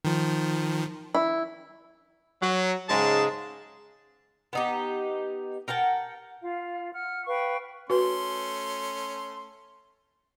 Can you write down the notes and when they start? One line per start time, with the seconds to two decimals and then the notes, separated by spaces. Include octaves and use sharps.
0.05 D#3 F3
1.15 E4
2.41 F#3
2.88 G#2 C#3 G#3 G#4 A5
4.53 B3 D#4 G4
5.68 A#4 F#5 G5 A5
6.43 F4 F5
6.92 F#5 F6
7.26 B4 F5 G5 C#6
7.90 A3 C#4 F#4 B4 C6